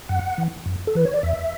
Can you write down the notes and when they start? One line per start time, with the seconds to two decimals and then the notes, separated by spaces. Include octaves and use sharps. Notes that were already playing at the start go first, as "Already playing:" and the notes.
0.09 F#2 F#5
0.38 E3
0.66 F#2
0.87 A4
0.95 E3 B4
1.05 C#5
1.14 D5
1.23 E2 E5